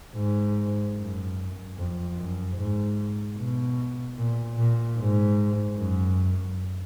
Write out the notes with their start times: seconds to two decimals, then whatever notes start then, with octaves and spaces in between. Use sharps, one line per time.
0.15 G#2
0.97 F#2
1.77 F2
2.17 F#2
2.56 G#2
3.37 B2
4.17 A#2
4.57 A#2
4.98 G#2
5.77 F#2